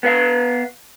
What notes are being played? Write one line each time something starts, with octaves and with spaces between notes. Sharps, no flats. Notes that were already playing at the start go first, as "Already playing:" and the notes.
B3 B4 F5